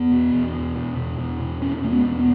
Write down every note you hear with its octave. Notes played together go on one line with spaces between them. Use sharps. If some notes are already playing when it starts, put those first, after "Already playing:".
Already playing: E2 B3
B2
E2
B2
E2
B2
E2
B2
E2 C#4
B2 A3
B3
E2
B3